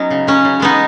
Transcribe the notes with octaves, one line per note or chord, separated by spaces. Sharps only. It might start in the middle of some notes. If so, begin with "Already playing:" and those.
Already playing: F#3 B3 C#4 D#4
C#3
F#3 C#4
C#3
G#3 B3 D#4